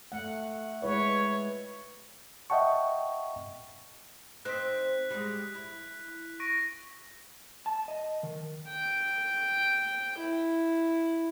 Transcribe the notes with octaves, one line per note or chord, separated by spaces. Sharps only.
A3 F#5
G#3 E4 B4 C#5
D#5 E5 F#5 G5 A5 C#6
C4 D#4 C5 F#6 B6
G3 G#3
E4
C#6 A#6 D7
A5
D#5
D#3
G5
E4